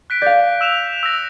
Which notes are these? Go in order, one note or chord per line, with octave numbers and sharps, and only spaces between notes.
F#6 B6 D7
D5 F5 G6
E6 E7 F7
E6 A#6